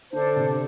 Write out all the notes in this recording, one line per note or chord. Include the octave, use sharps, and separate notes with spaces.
D3 D4 A4 C5
C3